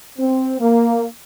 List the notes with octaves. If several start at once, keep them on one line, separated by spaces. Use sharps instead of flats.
C4
A#3